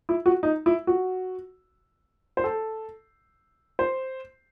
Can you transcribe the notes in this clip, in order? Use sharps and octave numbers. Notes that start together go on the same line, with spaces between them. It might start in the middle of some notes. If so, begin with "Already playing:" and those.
E4
F#4
D#4
E4
F#4
C5
A4
C5